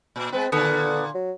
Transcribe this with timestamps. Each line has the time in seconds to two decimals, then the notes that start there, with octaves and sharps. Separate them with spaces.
0.16 A#2
0.32 G#3 B3 C4 B4
0.52 A#2 D3 B3 A4
1.14 F#3